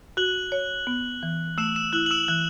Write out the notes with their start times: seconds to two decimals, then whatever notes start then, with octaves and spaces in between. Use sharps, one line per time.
0.17 F#4 F#6 F#7
0.52 C#5
0.87 B3
1.23 E3
1.58 A3 E6 E7
1.76 E6 E7
1.93 E4 F#6 F#7
2.06 F#7
2.11 E6 E7
2.28 E3 F#6